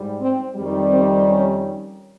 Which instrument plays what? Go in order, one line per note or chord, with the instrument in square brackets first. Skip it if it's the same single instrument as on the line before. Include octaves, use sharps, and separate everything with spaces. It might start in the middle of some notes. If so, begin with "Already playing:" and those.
Already playing: [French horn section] G#2 G3
C4
F2 D#3 G3
C4
C#4